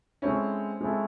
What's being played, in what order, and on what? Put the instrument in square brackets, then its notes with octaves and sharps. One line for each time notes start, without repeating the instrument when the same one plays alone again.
[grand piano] G#3 C4 E4 A4 [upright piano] C#4
[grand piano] G#3 C4 E4 A4